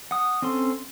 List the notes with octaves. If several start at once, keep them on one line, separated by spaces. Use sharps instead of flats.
F#5 D#6
C4 C#4 A4 C6